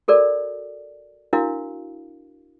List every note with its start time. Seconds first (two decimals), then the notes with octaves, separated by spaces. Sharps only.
0.08 F#4 A4 A#4 D5
1.33 D4 E4 F#4 A#4 F5